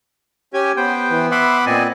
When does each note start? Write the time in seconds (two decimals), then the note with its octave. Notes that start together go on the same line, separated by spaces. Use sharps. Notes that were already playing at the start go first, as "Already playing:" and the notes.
0.54 C#4 G4 G#5
0.77 B3 C5 G5
1.10 E3
1.31 E5 F#5 B5 C6 D6
1.66 A#2 C4 D5 D#5 G#5